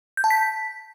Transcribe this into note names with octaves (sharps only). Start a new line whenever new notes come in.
G6
A5
B6